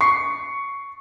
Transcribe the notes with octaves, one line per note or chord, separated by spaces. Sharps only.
C#6 C7